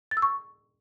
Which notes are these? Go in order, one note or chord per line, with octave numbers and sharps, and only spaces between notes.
A6
E6
C#6